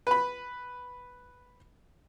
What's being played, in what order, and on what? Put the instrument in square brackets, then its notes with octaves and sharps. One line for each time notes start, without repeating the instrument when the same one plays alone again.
[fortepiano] B4 B5